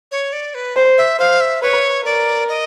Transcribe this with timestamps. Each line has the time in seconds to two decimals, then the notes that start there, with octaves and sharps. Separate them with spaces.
0.12 C#5
0.33 D5
0.55 B4
0.76 C5
0.98 E5
1.19 C5 F5
1.41 E5
1.62 B4 C#5
2.05 A#4 D5
2.49 D#5